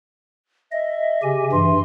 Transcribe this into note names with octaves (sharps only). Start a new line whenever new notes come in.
D#5 E5
C#3 G4 G#5
G2 E3 C6